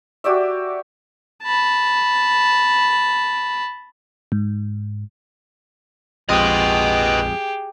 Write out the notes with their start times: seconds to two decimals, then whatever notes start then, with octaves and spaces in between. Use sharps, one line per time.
0.24 F#4 G4 D5 E5
1.43 A5 B5
4.32 G#2
6.29 A#1 F2 F3 G#3 G4 G#4 B4 D#5